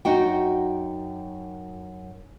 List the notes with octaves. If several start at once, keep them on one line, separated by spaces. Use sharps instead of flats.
F#2 D#4 F#4 G5